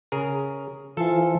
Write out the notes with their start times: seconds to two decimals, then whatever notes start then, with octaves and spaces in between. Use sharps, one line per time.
0.12 C#3 G#4 A#4
0.97 E3 F4 A4 C5 G#5 A5